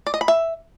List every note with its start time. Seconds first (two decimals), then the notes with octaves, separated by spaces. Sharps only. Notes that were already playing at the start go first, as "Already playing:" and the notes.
0.07 D5
0.14 D#5
0.21 B5
0.28 E5